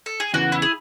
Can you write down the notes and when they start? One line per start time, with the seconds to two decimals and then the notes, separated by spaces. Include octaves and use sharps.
0.06 A4
0.20 G#4
0.34 E2 C#3 E3 F#4
0.52 E4
0.62 G#4